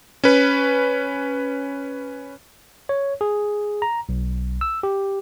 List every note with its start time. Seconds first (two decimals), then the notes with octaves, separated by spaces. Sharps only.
0.24 C#4 B4
2.89 C#5
3.21 G#4
3.82 A#5
4.09 B1
4.61 E6
4.83 G4